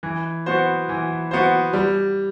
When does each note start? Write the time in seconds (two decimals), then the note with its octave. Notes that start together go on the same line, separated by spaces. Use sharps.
0.03 E3
0.46 B3 F#4 C5
0.89 E3
1.31 B3 F#4 C5
1.73 G3